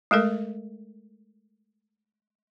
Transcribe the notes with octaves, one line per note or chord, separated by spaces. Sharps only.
G#3 A3 A4 A#4